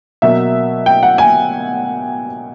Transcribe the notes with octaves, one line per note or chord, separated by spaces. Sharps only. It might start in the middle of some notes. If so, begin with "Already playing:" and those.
B2 F#3 A#3 E5
G5
F#5
G#5